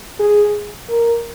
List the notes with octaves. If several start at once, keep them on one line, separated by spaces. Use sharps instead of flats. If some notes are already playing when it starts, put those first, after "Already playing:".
G#4
A#4